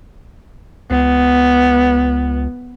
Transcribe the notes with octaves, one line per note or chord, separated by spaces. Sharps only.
C#2 B3